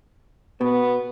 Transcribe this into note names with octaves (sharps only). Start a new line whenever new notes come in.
B2 B3